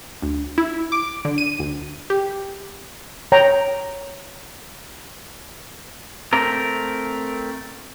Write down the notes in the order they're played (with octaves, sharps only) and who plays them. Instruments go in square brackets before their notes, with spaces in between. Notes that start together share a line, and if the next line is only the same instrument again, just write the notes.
[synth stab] D2
E4
D6
D3
D#7
D2
G4
[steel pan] C#5 G5 A#5
[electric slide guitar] A3 C4 A#4